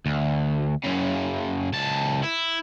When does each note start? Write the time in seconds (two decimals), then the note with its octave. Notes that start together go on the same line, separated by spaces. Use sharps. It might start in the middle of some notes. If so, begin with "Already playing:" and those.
0.06 D2
0.84 F#2 C#3
1.73 C#2 A5
2.23 E4